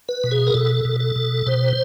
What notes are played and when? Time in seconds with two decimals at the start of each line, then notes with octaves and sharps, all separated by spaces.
0.09 B4
0.24 B2
0.31 G#4
0.47 A#4
0.54 B2 A4
0.85 B2
1.00 A4
1.16 B2
1.46 B2 C5